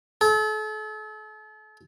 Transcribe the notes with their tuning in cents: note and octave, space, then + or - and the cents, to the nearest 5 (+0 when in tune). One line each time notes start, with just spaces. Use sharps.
A4 -40